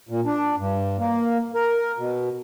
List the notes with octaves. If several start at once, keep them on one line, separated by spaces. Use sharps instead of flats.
A#2
D4
G2
A#3
A#4
B2